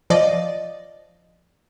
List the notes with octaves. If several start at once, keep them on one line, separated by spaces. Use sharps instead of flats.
F3 D5 D#5